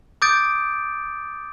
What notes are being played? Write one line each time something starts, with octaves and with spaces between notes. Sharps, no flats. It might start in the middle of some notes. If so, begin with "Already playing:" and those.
D6 D#6 G6 A6 D7